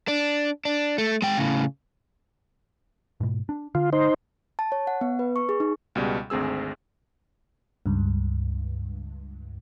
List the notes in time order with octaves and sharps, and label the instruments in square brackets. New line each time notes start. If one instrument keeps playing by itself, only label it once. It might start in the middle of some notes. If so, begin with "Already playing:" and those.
[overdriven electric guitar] D4
D4
A3
G#3 G5
A2 C#3
[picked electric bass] G#2 B2
D4
[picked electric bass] D3 [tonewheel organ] F4
[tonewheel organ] D#4 C5
[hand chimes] A5
C#5
F#5
B3
B4
C#6
G#4
D#4
[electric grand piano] C#2 B2 G3 G#3
G#1 D2 C4 G#4 E6
[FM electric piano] C#2 G2